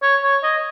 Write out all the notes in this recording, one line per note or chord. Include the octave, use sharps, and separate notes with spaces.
C#5
C#5
D#5